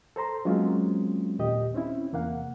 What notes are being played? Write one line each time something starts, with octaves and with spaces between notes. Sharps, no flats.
A4 C5 A#5 C6
F#3 G#3 A#3 C4 C#4 F4
D#2 A#2 G4 D#5
C4 C#4 E4
E2 C3 A#3 F5 F#5